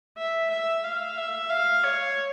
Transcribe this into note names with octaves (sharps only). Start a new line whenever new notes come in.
E5
E5
F5
E5
F5
C#5